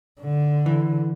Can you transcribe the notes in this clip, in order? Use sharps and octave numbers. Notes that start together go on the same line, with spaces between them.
D3
E3